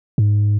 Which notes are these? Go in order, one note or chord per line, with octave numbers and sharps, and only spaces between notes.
G#2